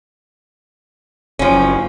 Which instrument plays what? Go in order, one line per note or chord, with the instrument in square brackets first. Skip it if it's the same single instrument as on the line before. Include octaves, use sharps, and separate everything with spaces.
[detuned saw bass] F#1 [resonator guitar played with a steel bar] F3 C#4